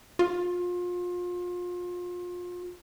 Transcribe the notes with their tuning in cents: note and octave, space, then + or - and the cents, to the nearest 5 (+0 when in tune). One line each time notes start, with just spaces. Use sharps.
F4 +30